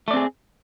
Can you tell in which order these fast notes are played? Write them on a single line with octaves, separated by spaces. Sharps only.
A3 D5 C4 G#4